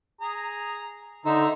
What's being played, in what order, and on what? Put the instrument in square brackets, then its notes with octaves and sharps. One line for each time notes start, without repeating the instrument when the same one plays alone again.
[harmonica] G#4 A#5
[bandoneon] D3 D#4 [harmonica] C5 E5 A#5